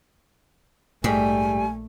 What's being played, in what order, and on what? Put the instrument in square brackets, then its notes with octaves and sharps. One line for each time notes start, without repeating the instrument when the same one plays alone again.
[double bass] A#1 A3 [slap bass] G#2 [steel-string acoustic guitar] G3 [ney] G#5